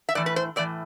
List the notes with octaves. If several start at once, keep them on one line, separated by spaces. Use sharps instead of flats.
E5
A2 E3 D5
B4
C5
A2 E3 D5